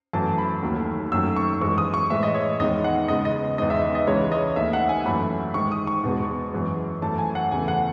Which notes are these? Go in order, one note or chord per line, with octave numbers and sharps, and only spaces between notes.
F#2 E3 A3 A5
B5
D#2 D#3 F#3 A3
F#2 D#3 F#3 A3 E6
C#6
F#2 E3 G#3 C#6
D#6
C#6
A2 E3 G#3 E5
D#5
C#5
E2 D#3 G#3 D#5
F#5
E2 C#3 G#3 D#5
D#5
E2 D#3 G#3 D#5
E5
D#5
C#2 C#3 E3 G#3 C#5
D#5
D#2 D#3 A3 E5
F#5
G#5
F#2 E3 A3 B5
G#2 D#3 G#3 C#6
D#6
C#6
E2 B2 G#3
F#2 E3 G#3
F#2 E3 A3 A5
G#5
F#5
E2 C#3 E3 A3 G#5
F#5